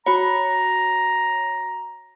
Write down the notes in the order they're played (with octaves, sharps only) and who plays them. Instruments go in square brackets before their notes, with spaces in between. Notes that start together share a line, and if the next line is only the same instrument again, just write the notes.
[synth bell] F#4 C#5 [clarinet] A#5 [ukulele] B5